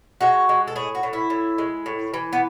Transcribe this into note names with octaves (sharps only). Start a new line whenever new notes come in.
G#3 F#4
G#3
A4
A2 G#4
F#4
A2
E4
A2
G#3
A2
E3
B3